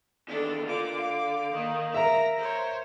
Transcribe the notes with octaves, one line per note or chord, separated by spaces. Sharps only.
E2 D#3 D4 A4
D3 A#3 F4 D6
F5
D#3 A#3
A#4 E5 A#5
C5 C#5